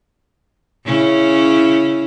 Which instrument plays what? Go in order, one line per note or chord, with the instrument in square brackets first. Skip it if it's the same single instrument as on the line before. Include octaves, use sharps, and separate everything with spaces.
[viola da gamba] C#3 C#4 E4